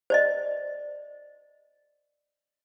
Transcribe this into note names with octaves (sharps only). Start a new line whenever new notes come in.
C5 D5 D#5